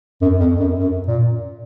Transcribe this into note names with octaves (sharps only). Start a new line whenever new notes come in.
F#2
F2
F#2
F#2
A#2